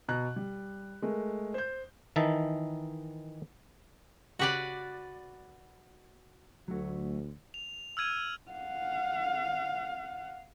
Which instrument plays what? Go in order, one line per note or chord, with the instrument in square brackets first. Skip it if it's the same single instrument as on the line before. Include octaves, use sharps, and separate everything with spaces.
[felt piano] B2 A#5 F#6
G3
G#3 A3 A#4
C5 G6
[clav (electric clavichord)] D#3 E3 D#4 E5 A5
[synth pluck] C#3 G4 [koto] F#4 B4 D5
[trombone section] D2 [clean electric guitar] F#3 A3 F#4
[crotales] F7
E6 F6 G#6 D#7
[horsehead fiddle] F5 F#5